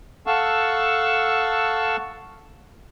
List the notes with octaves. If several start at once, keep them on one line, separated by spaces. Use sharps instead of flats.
A4 F5 F#5 A5 C#6 E6